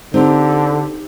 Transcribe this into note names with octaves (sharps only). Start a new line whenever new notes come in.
D3 C4 D#4 G4